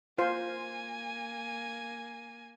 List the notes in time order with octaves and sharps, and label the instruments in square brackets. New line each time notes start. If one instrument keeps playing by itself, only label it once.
[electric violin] A#3 G#5 [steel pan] F4 C5